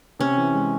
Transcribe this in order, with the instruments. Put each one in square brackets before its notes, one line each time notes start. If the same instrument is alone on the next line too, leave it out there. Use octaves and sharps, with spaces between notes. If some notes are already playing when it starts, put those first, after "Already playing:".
[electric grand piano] C3 [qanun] C#4
[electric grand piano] E3
G#3